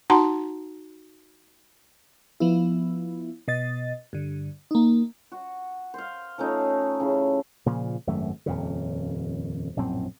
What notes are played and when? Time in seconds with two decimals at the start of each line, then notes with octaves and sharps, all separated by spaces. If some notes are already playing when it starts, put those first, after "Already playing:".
0.10 D#4 F#4 F#5 A5 A#5 C6
2.40 F3 B3 E4
3.48 B2 D#5 A6
4.13 G2 D3
4.71 A#3 D#4
5.32 F#4
5.94 C5 F5
6.38 F3 A3 C#4 D#4
7.00 C#3 E3
7.66 A#2 C#3 F3
8.07 G#1 F#2 A3
8.46 D#1 F2 C#3
9.77 A#1 F#2 A2 C4